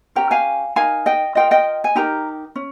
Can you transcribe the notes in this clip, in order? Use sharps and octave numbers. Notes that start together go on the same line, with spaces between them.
C#4 G4 A#4 G5 A#5
F5 G#5
D#4 A#4 F5 G#5
D#5 G5
F4 A#4 D#5 G5
D#5 G5
G#5
D#4 G4 A#4 G5 A#5
C#4